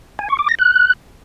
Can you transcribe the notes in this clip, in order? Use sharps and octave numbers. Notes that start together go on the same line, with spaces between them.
G#5
C#6
D6
A#6
F#6